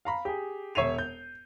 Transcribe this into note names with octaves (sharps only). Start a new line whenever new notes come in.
F5 A#5 B5
G4 G#4
E1 C#5 E5 C7 D#7 F7
G6